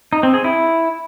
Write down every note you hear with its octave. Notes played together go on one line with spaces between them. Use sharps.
D#4
C4
G#4
E4